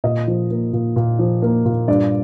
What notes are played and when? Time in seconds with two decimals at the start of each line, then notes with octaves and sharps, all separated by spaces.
0.04 A#2 D#5
0.27 F3
0.51 A#3
0.73 A#2
0.96 A#2
1.19 F3
1.42 A#3
1.65 A#2
1.88 G2 D5